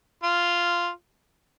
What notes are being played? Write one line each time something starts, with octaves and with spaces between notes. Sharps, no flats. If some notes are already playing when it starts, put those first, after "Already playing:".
F4